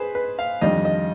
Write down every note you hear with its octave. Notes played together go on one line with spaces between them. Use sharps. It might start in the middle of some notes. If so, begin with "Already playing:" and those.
Already playing: G#4 B4 C5
B4
F5
F2 D#3 G3 D4 D#5
D#5